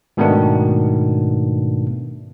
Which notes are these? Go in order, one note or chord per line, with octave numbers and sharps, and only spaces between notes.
G#2 B2 D#3 A3 B3 D4